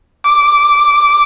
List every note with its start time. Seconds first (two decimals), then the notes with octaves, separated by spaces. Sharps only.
0.24 D6